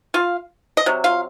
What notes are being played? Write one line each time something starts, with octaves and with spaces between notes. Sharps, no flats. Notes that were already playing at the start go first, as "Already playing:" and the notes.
F4 F5
D#5
C3 F#3
F4 F5